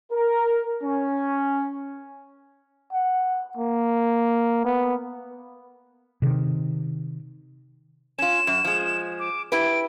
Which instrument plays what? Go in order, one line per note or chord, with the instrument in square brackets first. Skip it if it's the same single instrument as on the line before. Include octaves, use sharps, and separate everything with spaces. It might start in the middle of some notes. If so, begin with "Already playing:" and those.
[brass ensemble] A#4
C#4
[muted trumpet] F#5
A#3
B3
[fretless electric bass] C3 D#3
[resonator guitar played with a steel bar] C#4 F4 [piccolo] E7
[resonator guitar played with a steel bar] F#2
F3 G#3
[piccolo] D6
[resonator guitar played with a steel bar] E4 G4 B4 [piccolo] D7